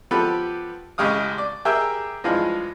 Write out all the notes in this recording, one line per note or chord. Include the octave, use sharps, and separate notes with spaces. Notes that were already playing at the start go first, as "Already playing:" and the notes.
F3 B3 G4 A4 B4
A1 C#3 G#3 G4 F5 D#6
D5
G4 G#4 A#4 E5 G5
G2 E3 F3 G#3 F4